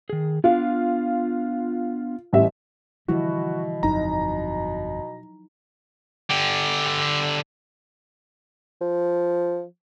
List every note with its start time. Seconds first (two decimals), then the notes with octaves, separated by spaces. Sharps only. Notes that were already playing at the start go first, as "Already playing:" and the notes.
0.10 D#3 G#4
0.44 B3 D4 F4 F5
2.33 A1 G3 E5
3.08 B2 D3 E3 F3 G3 E4 F#4
3.83 G1 F2 F#3 D#4 A#5
6.30 D3 G4
8.81 F3